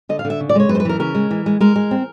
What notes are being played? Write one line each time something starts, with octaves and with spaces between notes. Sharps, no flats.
D3 D#5
F5
D3
E5
C#3
D5
G#3 C#5
F#2 B4
C5
B4
E3 A#4
C#3 A#4
G#3
E3
G#3
G#3 A#4
G#3
C4